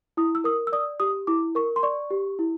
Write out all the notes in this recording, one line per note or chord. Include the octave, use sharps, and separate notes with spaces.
E4 D#6
E6
A#4 D#6
E6
D5 D#6
G4 D#6
E4 D6
A#4 C#6
C6
D5 C#6
G4
E4